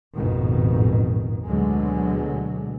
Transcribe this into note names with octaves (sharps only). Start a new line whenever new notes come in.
A1 F2 G#2 B2 D#3
D2 B2 D3 F#3 G#3